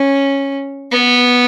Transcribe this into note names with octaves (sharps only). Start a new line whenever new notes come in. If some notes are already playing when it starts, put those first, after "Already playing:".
Already playing: C#4
B3